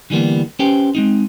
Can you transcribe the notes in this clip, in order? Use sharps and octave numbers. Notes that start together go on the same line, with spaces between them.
D3 E3 G3 A#3 B3
C#4 G4 B4 C5 G5
G#3 C4 D#4